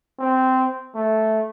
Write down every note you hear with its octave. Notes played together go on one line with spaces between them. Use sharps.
C4
A3